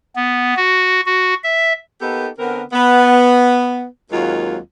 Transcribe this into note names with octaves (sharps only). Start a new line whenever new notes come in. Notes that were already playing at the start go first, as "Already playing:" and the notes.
B3
F#4
F#4
E5
A#3 B3 D#4 G4 A4
D3 B3 C4 A#4
B3
D#2 F#3 G#3 A#3 C4 F4